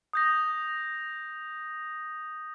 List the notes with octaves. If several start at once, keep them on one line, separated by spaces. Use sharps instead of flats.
D#6 G6 A#6